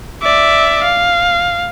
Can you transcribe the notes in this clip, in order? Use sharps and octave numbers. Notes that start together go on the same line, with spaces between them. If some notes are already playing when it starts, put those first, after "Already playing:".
D5 E5
F5